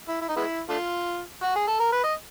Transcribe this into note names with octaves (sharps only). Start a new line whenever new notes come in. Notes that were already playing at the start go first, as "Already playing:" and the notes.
E4
E4
D#4
G#3 B3 E4
A3 D4 F4
F#4
G#4
A4
A#4
B4
D#5